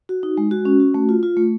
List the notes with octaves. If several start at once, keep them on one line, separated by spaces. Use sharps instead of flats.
F#4
D#4
G#3
F#4
C#4
F#4
A3
F4
F4
A3